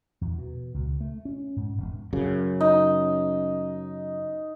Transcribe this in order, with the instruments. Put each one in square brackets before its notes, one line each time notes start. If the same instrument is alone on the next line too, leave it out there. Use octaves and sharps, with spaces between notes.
[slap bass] E2
B2
C#2
A3
C#4
G#2
E1
[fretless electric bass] F#2 C#3
[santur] D#4